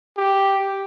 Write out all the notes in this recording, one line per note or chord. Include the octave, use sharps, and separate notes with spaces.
G4